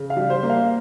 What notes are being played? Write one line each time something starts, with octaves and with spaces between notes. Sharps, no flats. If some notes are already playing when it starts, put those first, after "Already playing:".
Already playing: C#3
F5
G3
C5
A#3
F5